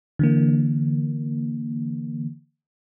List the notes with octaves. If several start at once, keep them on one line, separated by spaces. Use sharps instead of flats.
D3 E3 A#3